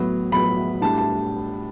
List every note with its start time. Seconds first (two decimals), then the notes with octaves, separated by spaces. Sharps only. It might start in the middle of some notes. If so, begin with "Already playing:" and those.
Already playing: A2 F#3 B3
0.32 A2 F#3 B3 B5
0.82 A2 G3 D4 A5
0.98 A5